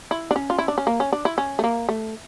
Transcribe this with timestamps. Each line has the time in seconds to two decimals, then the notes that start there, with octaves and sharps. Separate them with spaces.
0.11 E4
0.31 D4
0.36 C#4
0.50 F4
0.59 E4
0.68 D4
0.78 C#4
0.87 A#3
1.00 C#4
1.12 D4
1.25 E4
1.38 C#4
1.59 A3
1.64 A#3
1.89 A3